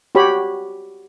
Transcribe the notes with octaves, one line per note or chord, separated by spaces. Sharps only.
F#4 G4 C#5 B5